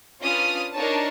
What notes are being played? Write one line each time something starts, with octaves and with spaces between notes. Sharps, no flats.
C#4 D4 F4 B4 D#6 F6
D4 D#4 A#4 C#5 A5